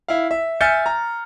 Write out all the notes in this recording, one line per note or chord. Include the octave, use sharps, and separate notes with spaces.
E4 F5
E5
E5 G#5 F6 G6 A6 C#7
A#5